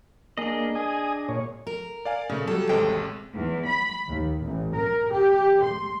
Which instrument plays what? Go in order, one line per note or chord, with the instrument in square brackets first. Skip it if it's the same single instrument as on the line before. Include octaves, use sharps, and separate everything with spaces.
[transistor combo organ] A#3 [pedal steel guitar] D4 G#4 D#5
[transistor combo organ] G#5 D#6
A#2 C#5
[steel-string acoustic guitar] A#4
[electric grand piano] D5 F5 G#5
[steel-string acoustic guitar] A#2 [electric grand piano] C#3 A3
[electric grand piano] F#3 G3 [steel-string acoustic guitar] A4
[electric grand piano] A1 C3 G#3 [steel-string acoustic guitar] D#2 G5
[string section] E2
B5
D#2
A1
A#4
G4
C6